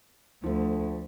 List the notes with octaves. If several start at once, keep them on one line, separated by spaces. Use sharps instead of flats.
D2 F3 A3